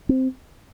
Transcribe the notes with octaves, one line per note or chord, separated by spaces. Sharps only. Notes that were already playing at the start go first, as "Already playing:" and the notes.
C4